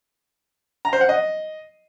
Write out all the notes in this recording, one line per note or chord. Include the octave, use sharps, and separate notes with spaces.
A#5
C5
F#5
D#5